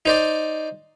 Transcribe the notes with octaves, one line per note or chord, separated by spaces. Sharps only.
D#4 C5 D5